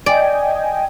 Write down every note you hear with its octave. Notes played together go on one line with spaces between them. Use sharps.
D5 D#5 G5 G#5